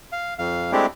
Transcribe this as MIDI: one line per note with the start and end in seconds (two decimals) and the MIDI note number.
0.12 0.34 77
0.38 0.72 41
0.38 0.72 77
0.72 0.86 56
0.72 0.86 57
0.72 0.86 60
0.72 0.86 62
0.72 0.86 64
0.72 0.86 67